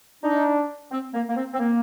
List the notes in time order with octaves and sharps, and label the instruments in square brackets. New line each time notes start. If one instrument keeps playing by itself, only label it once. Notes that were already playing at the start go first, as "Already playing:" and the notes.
[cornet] D4 [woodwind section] D#4
[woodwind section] C4
A#3
A#3
C4
C4
A#3